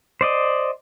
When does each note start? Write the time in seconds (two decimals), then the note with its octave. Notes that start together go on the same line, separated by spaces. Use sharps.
0.21 C5 D5 D#5